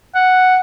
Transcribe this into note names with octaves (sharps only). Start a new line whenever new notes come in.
F#5